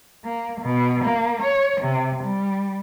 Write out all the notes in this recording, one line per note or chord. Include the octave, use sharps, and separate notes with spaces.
A#3
B2
A#3
C#5
C3
G3